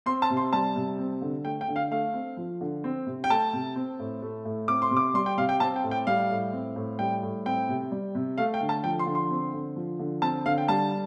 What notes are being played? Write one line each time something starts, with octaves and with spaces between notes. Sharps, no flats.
C4 C6
A5
C3
C6
G3 A5
C3
C4
D3
A3 G5
G5
D3
F5
A3 F5
C4
F3
D3
C4
C3
G5
A3 A5
C3
C4
A2
A3
A2
C4 D6
C6
C3
D6
G3 C6
G5
C3 F5
G5
C4 A5
G5
A2
G5
G3 F5
A2
C4
A2
G3 G5
A2
C4 G5
C3
G3
C3
A3 F5
G5
D3
A5
F3 G5
C6
D3
C6
C4
D3
F3
D3
C4 A5
D3 F5
G5
G3 A5